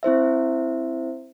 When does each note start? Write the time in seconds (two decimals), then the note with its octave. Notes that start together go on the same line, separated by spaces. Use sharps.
0.03 C4 E4 C5 E5